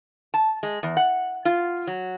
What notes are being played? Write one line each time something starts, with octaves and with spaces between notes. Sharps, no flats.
A5
G#3
E2
F#5
F4
F#3